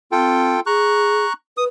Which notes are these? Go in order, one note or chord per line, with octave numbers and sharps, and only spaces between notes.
C4 F4 A4 G5
G#4 A#5 C#6 F#6
B4 D#6